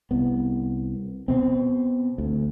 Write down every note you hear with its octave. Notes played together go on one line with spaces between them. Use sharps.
C2 B3
B2 C4
D2